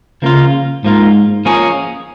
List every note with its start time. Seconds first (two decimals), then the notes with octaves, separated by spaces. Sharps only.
0.22 C#3 F3 A#3 F4
0.84 G#2 F3 A#3 F4
1.45 F3 A#3 C#4 G#4